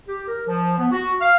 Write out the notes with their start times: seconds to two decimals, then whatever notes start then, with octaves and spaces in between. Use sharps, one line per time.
0.07 G4
0.27 A#4
0.47 F3
0.78 B3
0.90 F#4
1.19 F5